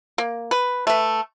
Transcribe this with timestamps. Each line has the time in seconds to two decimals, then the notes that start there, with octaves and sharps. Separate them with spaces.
0.18 A#3
0.51 B4
0.87 A3 B4